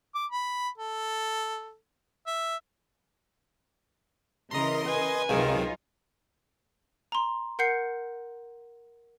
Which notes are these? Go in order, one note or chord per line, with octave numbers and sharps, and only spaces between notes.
D6
B5
A4
E5
C#3 E3 A#4 D#5 A#5 C6
B4 G#5
C#2 C3 D#3 F#3 D#4 F4
A#5 C6
A#4 F#5 G6 C7 C#7